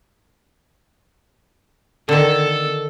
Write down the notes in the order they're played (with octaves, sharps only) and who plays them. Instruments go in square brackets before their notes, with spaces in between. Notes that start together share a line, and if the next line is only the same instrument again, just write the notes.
[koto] D3 D#3 [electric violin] A4